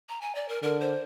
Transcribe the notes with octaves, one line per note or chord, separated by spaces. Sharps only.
A#5
G#5
D5
A#4
D3 A#4
C5